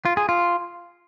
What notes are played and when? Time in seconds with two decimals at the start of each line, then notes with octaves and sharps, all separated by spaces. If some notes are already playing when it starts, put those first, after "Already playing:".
0.05 F4
0.17 G#4
0.29 F4